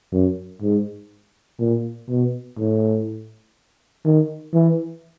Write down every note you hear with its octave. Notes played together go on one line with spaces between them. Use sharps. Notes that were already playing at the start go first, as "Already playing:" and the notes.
F#2
G#2
A#2
B2
A2
D#3
E3